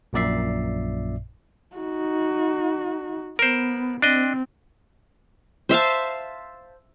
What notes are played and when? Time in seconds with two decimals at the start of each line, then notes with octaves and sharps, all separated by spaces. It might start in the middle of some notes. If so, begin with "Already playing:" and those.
0.13 A#1 F#2 A#2 D5 E5 C7
1.76 D#4 F#4
3.39 B3 A#4 C5
4.02 C4 D4 D#5
5.69 C5 E5 F5 A5